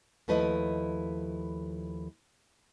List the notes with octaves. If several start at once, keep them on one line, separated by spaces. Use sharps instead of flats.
D#2 F3 A3 E4 B4 D#5